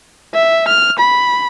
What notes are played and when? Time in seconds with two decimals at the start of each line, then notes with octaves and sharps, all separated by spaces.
0.34 E5
0.68 F6
0.99 B5